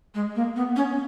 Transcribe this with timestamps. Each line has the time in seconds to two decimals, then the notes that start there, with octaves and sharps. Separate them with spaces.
0.15 G#3
0.36 A#3
0.56 B3
0.76 C#4